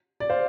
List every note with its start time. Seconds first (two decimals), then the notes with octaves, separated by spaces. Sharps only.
0.20 D5
0.30 C5 F5